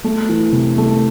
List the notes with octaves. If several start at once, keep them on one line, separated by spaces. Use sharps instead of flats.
A3
E3
C3
A3